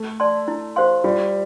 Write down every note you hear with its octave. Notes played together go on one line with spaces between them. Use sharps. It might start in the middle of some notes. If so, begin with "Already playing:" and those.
Already playing: A3
D5 A5 C6
E4
G4 C5 F5 C6
G3 F4